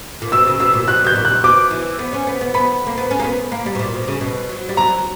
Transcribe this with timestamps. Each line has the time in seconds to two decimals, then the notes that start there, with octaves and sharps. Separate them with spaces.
0.22 A#2
0.32 B2 E6
0.47 C#3
0.60 B2 E6
0.74 A#2
0.88 B2 F#6
1.04 B2 G6
1.16 A#2
1.25 F#6
1.44 B2 D6
1.71 E3
1.99 B3
2.13 C#4
2.27 B3
2.41 B3
2.54 B3 B5
2.87 A#3
2.98 B3
3.11 C#4
3.19 A#3
3.24 B3
3.52 A#3
3.66 G3
3.75 B2
3.79 A#2
3.94 B2
4.08 C#3
4.21 B2
4.49 F#3
4.69 G3
4.77 F#3 A#5